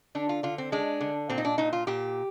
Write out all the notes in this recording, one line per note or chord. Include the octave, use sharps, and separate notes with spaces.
D3 D4
F4
D3 F4
C4
G#3 D4
D3
A#2 C4
D#4
D4
A#2 D#4
F4
A#2 G4